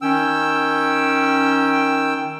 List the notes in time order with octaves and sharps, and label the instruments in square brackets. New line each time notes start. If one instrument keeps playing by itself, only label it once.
[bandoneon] D#3 G5 E6 [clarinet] C#4